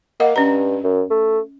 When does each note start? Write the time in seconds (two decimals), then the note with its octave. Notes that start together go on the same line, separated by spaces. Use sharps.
0.20 A#3 D#5 F#5
0.36 G2 C#4 A#5
0.84 F#2
1.10 A3